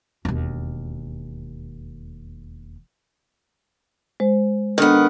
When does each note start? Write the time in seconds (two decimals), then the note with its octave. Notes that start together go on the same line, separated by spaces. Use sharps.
0.25 E1 D#2
4.20 G#3 C5
4.78 D#3 B3 D4 A4